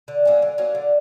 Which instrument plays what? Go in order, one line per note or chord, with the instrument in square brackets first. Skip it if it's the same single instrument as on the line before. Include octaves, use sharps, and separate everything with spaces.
[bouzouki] D3
F#3 A#3 C#4
D3
F#3 A#3 C#4
D3